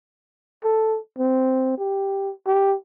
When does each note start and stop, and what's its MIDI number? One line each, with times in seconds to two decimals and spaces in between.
0.64 0.97 69
1.19 1.77 60
1.79 2.30 67
2.47 2.74 67